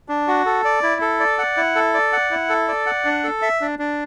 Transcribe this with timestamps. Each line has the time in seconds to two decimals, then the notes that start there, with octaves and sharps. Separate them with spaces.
0.09 D4
0.28 F#4
0.46 A4
0.65 D5
0.83 E4
1.01 A4
1.20 D5
1.38 F#5
1.57 E4
1.75 A4
1.94 D5
2.13 F#5
2.31 E4
2.50 A4
2.68 D5
2.86 F#5
3.05 D4
3.24 A4
3.42 E5
3.61 D4
3.79 D4